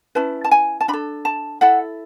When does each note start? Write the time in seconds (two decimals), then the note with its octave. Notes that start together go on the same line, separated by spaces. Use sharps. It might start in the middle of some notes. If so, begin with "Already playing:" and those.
0.15 C#4 E4 B4 A5
0.44 A5
0.51 G#5
0.81 A5
0.88 D4 B5
0.93 A4
1.25 A5
1.61 E4 A4 F#5